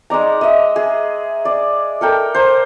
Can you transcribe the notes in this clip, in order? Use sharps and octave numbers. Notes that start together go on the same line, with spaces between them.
G#3 D#4 D5 A#5
D#5 E5
G#4
D5
A4 A#4 G5
C5 A#5